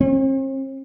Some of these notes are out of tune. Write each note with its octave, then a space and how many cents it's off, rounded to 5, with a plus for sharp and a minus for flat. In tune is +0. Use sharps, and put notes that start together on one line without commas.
C4 +45